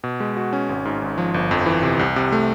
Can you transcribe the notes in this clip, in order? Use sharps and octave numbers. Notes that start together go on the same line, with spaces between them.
B2
G#3
F#4
C#4
G#1
G#2
G#1
F3
G1
F2
E3
C3
C2
C3
A3